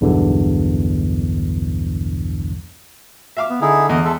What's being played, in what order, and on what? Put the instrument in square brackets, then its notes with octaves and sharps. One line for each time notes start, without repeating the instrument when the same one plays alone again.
[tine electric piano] B1 E2 G2 B2 D3 E3
[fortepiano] E5 F5 D6
[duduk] B3
[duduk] D3 [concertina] D#4 E4 G#4
[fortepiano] E2 [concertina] D#5
[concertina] G#3 A4 E5